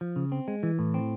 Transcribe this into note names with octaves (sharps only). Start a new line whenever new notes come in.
F3
C#3
C4
G#3
E3
A2
C4